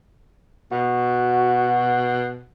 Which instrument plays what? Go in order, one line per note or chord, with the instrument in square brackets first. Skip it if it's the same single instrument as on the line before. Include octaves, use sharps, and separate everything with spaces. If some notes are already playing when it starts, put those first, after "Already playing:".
[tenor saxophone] B2 [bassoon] F#4